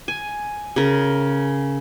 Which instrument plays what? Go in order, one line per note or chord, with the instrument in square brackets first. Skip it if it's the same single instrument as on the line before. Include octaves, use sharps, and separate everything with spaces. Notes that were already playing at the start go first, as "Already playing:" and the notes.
[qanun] G#5
C#3 A#4